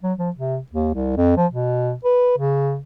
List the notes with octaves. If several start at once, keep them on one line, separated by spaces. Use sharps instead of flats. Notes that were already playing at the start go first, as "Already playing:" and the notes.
F#3
F3
C3
D#2
C2
F2
F3
B2
B4
C#3